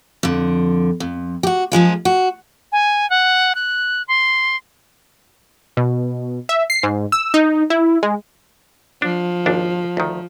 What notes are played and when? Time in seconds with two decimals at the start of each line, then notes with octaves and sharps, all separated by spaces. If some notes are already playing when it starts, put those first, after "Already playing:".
0.23 F2 D3
1.00 F2
1.43 F#4 G4
1.72 F#2 F3 G#3 F4
2.05 F#4
2.72 G#5
3.10 F#5
3.55 F#6
4.08 C6
5.77 B2
6.49 E5
6.70 C7
6.83 G#2
7.12 E6
7.34 D#4
7.70 E4
8.03 G#3
9.02 F3 D4
9.46 G#1 D#2 D4
9.97 D2 D#3